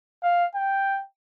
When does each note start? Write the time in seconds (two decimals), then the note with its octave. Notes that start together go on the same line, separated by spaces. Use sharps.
0.23 F5
0.55 G5